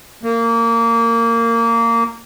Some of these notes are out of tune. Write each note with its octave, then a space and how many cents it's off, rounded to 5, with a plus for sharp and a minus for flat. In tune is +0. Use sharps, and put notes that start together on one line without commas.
A#3 -20